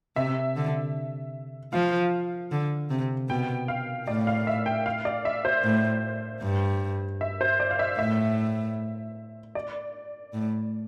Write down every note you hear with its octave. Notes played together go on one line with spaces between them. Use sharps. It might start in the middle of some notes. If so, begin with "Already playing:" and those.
C3 E5
D3
F3 F5
D3
C3
B2 G5
F5
A2 D5
F5
E5
G5
F5
D5
E5
C5
A2
G2
E5
C5
D5
F5
E5
A2 E5
D5
A2